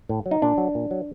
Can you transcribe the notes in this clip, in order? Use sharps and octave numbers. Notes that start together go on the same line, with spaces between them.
A2
F#3
D#4
A#2 D4
F#3
A#2
F#3